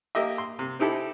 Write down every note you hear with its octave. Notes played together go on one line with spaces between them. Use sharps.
A#3 G4 D#5 E5
C6
C3
C4 D#4 E4 G4 A4